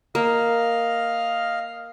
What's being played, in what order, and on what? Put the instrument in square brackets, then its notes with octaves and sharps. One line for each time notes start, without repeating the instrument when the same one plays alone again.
[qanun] A#3 [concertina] D#5 F5 F6